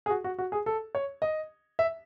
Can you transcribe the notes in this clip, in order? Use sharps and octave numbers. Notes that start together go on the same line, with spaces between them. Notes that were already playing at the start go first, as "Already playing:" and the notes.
G#4
F#4
F#4
F#4
G#4
A4
C#5
D#5
E5